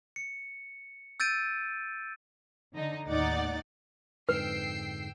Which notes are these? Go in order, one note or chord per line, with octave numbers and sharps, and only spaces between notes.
C#7
E6 G6 A6 D7 D#7
D3 D#4
D#2 A2 D#4 D5 F#5 A6
F2 G#2 D3 B4 G5 E6 C7